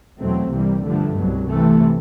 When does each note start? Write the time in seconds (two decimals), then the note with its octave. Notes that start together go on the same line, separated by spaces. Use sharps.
0.20 E2 B2 F#3 A3 C4
0.52 C2 C3 E3 G3 A#3
0.85 G2 D3 F3 A3
1.17 C2 B2 F#3
1.49 C3 E3 A3